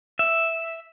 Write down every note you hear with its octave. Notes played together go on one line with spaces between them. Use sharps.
E5